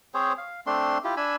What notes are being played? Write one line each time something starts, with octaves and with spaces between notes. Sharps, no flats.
C4 G#4 C5 C#5
F5
A3 C4 D4 C6
E4 F4 G4
D4 G#5 B5 E6